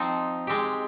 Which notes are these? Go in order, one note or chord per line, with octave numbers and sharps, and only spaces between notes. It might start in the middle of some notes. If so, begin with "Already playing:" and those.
Already playing: F3 C4 D#4
G#3 C4 G4